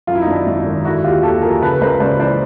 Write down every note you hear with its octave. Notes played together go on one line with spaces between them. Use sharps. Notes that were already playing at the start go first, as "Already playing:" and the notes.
F#2 F4
E4
D#4
G#1 D4 E4
G#1
D#3
D3 E4 F#4
D#2 F4 G4
D#2 G4 A4
F3 G#4 A#4
C#3 A4 B4
C#2 A#4 C5
C#2 C5 D5
E3 C5 D5